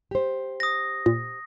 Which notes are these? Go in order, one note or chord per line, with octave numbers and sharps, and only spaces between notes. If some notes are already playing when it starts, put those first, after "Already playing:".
G4 C5
D#6 A#6
A#2